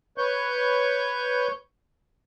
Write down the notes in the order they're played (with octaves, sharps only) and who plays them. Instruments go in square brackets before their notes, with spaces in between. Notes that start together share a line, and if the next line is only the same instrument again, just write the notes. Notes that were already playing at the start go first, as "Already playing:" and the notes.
[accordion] B4 C#5 C#6 G6